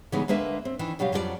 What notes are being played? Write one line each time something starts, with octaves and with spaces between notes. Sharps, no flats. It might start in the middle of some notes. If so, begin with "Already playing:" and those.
C#3 E3 G3 G#3 B3 D#4
D2 G#3 A#3 D4 B4 E5
C4
D#3 E3 D4
B2 F#3 G3 G4 F5
F2 F#3 G3 F4 G#4 D5